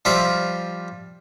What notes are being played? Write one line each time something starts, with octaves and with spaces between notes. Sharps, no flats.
F3 G3 F4 E5